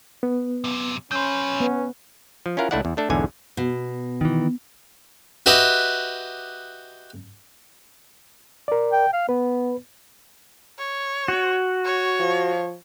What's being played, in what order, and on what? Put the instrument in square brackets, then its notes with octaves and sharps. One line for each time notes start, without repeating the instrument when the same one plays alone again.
[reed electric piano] B3
[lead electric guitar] F#2 C3
[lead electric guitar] F#3 B4 [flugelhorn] C#4 [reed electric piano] C6 G6
[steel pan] B3
[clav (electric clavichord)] F3
C#4 E4 F4 A#4 F5 F#5
C#2 A3 D4 E4 D5 F#5
E2
A3 D4 A4
B1 E2 G#2 D3 G#5
[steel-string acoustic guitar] B2
[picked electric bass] D#3 E3
[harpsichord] F#4 G4 B4 D#5 E5
[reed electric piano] A#4 D5
[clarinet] G5
F5
[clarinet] B3 [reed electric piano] B4
[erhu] C#5
[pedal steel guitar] F#4
[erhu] C#5
[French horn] F3